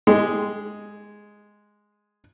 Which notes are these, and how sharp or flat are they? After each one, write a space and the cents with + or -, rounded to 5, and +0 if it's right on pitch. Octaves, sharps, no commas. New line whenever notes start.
G#3 +0 G4 +0